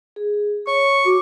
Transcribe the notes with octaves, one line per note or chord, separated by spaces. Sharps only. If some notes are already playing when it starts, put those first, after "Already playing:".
G#4
C#5 C#6
F#4 D6